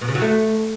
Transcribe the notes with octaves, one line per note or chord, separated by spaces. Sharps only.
B2
C#3
F#3
A3